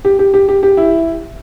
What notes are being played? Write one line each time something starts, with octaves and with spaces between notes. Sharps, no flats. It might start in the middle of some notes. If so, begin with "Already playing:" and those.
G4
G4
G4
G4
G4
E4